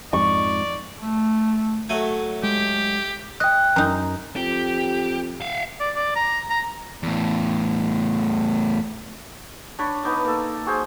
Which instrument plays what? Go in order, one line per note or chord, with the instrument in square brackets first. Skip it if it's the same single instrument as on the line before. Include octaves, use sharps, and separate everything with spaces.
[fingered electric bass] F2 G#2 [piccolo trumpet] D5 [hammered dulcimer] C#6
[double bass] A3
[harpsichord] F#3 A3 G#5
[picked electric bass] G#3 [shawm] G4
[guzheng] D#5 [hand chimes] G5 F#6
[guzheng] F#2 D#4 [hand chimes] A#5
[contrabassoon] F2 [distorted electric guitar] G4
[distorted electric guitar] E5 F5
[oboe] D5
D5
A#5
A#5
[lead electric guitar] E2 A2
[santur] D4 C#5 D5 B5
B3 D#4 D6
A#3 A4
F#4 G#4 C5